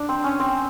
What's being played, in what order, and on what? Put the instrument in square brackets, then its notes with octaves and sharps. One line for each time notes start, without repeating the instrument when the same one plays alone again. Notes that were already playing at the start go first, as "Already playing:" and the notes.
Already playing: [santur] D4
C4
C#4
C4